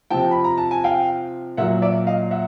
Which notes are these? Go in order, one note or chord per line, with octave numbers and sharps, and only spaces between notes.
C3 F3 G5 A5
B5
A#5
A5
G#5
F5 G5
A#2 F#3 E5 F#5
D5 E5
D#5 F5
E5 F#5